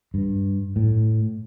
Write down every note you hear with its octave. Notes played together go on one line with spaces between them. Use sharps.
G2
A2